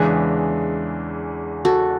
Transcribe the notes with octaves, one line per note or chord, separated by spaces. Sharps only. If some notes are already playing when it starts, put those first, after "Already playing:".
Already playing: E2 C#3 E3 G#3 D4 G#4 B4
F#4 A4